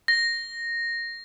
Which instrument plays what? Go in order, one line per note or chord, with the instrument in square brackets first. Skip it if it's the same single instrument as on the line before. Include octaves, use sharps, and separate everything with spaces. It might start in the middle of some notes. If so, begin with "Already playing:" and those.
[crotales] A#6